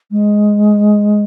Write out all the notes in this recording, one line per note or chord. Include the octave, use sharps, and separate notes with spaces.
G#3